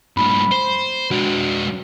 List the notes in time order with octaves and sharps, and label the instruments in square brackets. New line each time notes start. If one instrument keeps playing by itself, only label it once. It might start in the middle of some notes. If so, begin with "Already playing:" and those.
[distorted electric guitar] G2 A#2 [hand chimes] B5
[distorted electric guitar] C5
[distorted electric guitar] G#3 D4 [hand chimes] F#4 D7